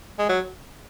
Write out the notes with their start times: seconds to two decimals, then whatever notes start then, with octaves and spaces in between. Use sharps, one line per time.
0.19 G#3
0.29 F#3